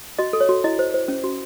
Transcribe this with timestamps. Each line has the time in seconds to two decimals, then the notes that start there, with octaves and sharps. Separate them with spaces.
0.19 F#4 D#5
0.33 A4
0.41 C#5
0.49 F#4
0.64 E4 D#5
0.79 C5
0.94 C5
1.08 C#4
1.24 F#4